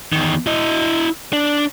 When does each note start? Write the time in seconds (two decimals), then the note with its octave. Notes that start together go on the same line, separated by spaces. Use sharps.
0.12 E2 D#3
0.47 E4 D#5
1.33 D4